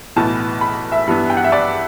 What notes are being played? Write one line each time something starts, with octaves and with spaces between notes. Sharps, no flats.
B1 A2 E3 B3 A5
B5
E5
G2 E3 B3
G5
F#5
E5
D5